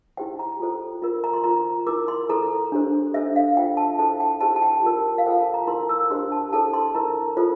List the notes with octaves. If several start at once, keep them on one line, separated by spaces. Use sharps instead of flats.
E4 G4 C5 G5
A#5
F4 A4 C5
F4 A#4
A#5
C6
F4 C5 A#5
E4 A#4 D6
C6
E4 A4 C5 A#5
D4 G4 C5
D4 A4 C5 E5
F5
F4 C5 G5
A5
E4 A4 C5 A5
G5
E4 G4 C5 A5
A5
G5
F4 A#4
F5
F4 A4 C5 G5
A5
A#5
E4 A#4 C6
E6
D4 G4 C5 C6
A5
E4 A4 C5 A5
C6
E4 A#4 A#5
F4 A4 C5